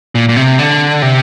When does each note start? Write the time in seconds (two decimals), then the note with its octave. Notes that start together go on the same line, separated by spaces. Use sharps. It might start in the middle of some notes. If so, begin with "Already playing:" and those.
0.15 A#2
0.29 A#2
0.36 C3
0.59 D3
1.02 C3